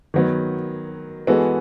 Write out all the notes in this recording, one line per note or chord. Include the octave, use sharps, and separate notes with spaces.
D#3 F#3 B3
E3 G#3 B3 F#4 A4